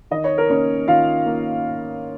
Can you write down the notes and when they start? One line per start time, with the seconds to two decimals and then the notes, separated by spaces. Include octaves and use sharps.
0.11 D#3 D#5
0.24 C#5
0.38 A#4
0.49 A#3 C#4 C#5
0.88 D#3 F4 F5
1.26 A#3